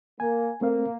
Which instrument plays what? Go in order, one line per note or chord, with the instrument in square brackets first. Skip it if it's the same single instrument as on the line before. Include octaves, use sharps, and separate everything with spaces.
[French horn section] A#3 [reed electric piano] G#5
[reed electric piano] A3 C4 F5 [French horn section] A#3